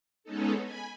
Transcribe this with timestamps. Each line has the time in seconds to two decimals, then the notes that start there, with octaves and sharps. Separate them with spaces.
0.24 G#3 B3 C#4 D#4 A4
0.63 G#5 B5